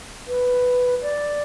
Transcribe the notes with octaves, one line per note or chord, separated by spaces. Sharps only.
B4
D5